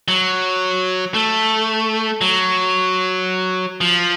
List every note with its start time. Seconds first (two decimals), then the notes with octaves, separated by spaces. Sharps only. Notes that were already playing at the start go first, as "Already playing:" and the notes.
0.08 F#3
1.14 A3
2.21 F#3
3.81 F3